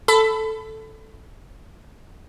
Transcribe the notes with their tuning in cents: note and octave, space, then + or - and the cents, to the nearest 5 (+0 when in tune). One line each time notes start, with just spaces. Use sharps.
A4 +0 B5 +25